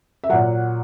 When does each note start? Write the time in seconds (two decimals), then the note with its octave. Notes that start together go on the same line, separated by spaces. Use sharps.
0.24 E5
0.29 A#2 F#3 F#5